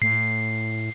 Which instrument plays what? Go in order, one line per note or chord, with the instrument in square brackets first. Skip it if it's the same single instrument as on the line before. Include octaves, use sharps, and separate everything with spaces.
[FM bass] A2 [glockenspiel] C7